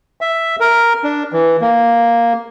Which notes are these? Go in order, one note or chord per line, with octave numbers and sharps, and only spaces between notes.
E5
A#4
D4
E3
A#3